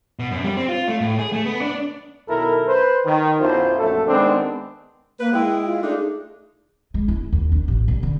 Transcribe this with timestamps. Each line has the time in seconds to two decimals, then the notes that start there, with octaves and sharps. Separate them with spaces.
0.19 B2
0.31 F#2
0.44 G3
0.57 C4
0.69 F4
0.88 A3
1.01 A2
1.19 G#4
1.33 A3
1.46 B3
1.61 D4
2.28 B1 B2 D#3 E4 A4 A#4
2.68 B4 C5
3.05 D#3
3.40 B1 F#2 B2 E4 F4 C5
3.78 A#1 F#2 A3 A4
4.08 D#3 G#3 A3 B3 C4 D4
5.19 A#3 B4
5.33 G#3 E4 G5
5.65 F4
5.83 A3 D4 D#4 G#4
6.94 G#3
7.08 E4
7.32 D#2
7.52 D4
7.68 A1
7.88 C2
8.03 D3